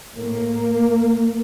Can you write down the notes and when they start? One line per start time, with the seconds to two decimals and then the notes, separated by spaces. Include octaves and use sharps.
0.16 A2 A#3